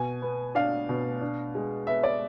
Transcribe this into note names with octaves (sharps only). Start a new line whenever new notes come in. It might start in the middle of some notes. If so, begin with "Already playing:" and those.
Already playing: B2 G#5
B3
D4 F5
B2
D4
G#3
B3 E5
D5